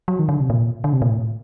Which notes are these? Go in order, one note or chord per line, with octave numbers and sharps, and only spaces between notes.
F#3
D#3
D3
C3
A#2
D3
C3
A#2
A2